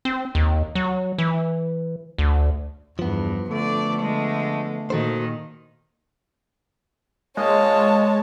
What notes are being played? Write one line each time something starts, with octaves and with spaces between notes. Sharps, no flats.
C4
D#2
F#3
E3
D2
E2 G2 F3 B3
D3 A3 D5
D3 G#3
A#2 D#3 F#4 A4 C5
A#2 G#3 A#3 C#5 D#5 A5